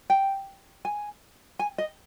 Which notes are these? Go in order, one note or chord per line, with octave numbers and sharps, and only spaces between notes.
G5
G#5
G#5
D#5